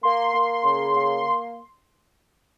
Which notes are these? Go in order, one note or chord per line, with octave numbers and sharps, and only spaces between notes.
A#3 C6
A#3
C#3
A#3